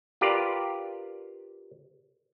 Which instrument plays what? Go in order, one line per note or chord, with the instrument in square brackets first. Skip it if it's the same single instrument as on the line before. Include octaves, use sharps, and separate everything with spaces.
[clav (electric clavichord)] F4 G4 A#4 B4 D5